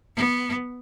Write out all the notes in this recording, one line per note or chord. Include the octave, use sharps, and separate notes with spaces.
B3